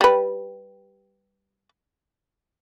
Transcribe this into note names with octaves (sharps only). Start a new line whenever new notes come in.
G3 B4